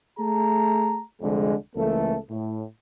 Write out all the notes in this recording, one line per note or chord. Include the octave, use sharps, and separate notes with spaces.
A3 G#4 A5 A#5
C2 F2 D3 G#3
C#2 E3 A3 A#3 A4
A2